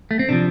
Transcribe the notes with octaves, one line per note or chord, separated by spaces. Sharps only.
A3
C4
C3 F3 D4